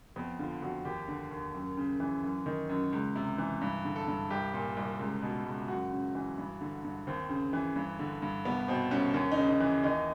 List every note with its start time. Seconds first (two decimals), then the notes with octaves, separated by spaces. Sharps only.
0.16 F2 B3
0.39 D3 F4
0.62 F2 F#4
0.85 D#2 G4
1.08 D3
1.31 D#2
1.54 F#2
1.77 C#3
2.00 E3
2.23 F#2
2.46 D#3
2.69 F#2
2.93 C#2
3.15 C3
3.38 E3
3.61 G2
3.85 D3
3.96 A4
4.08 G2
4.30 C2 G4
4.54 A#2
4.77 C2
4.99 C#2
5.22 B2
5.45 C#2
5.68 F#2 F#4
5.92 C#3
6.15 E3
6.38 G2
6.61 D3
6.84 G2
7.07 D#2 C4
7.29 C#3
7.53 E3
7.76 G2
7.99 D3
8.22 G2
8.45 C2 B3
8.68 B2 C4
8.91 C2 C#4
9.14 D#2 C#4
9.32 D#4
9.37 C#3
9.49 D#4
9.60 E3
9.84 D#2 D#4